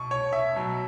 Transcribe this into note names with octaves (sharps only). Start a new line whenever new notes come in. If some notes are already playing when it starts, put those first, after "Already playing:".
Already playing: B2 C#6
C#5
E5
B2 F#3